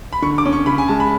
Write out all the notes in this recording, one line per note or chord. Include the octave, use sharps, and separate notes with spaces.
B5
D3 C#6
D6
C#4
C#6
C#3 B5
G#5
G#3 A5
B5